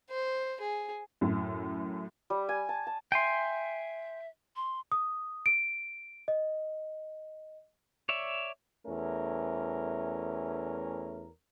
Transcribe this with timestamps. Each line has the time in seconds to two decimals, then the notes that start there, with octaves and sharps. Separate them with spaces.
0.11 C5
0.60 G#4
1.21 F#2 A2
2.30 G3
2.49 G#5
2.69 A5
2.87 A5
3.12 E5 G5 G#5 C6
4.56 C6
4.92 D#6
5.46 D7
6.28 D#5
8.09 C#5 D5 E5
8.86 E2 A3 C#4 A#4